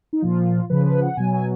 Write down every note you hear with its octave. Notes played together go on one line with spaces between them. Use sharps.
D#4
A#2 F3 F4
C#3 F3 B4
B4
F#5
B2 F#3 G#5
G#5